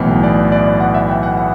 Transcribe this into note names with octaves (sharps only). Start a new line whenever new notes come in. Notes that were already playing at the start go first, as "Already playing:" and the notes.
Already playing: B1 A2 E3 B3
D5
D5
F#5
E5
G5
F#5
F#5